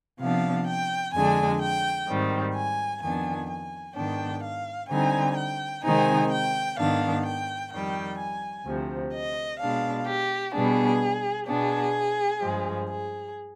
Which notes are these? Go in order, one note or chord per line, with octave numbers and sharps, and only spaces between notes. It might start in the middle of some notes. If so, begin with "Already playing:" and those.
C3 F3 B3 D4 F5
G5
F2 D3 G#3 D4 G#5
G5
G#2 D#3 G3 C4
G#5
F2 D#3 B3 D4 G#5
G#5
G#2 D#3 B3 D4 G5
F5
D3 G3 C4 D#4 G#5
G5
C3 D#3 G#3 C4 D#4 G#5
G5
G#2 D#3 B3 D4 F5
G5
F2 D#3 G3 G5
G#5
D2 C3 F3
D#5
B2 G#3 D4 F5
G4
B2 G3 B3 D4 G#4
B2 B3 D4 G#4
G2 F3 G#3
G#4